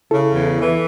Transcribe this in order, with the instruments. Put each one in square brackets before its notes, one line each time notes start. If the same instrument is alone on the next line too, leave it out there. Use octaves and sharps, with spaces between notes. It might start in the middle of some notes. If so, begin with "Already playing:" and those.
[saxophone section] C#3 [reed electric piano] E4 A4
[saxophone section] E2
E3